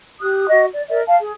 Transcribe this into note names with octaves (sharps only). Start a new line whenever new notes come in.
G4 D#6 F#6
F#4 D#5
D5
A#4 D5 E5
F5 A5
G#4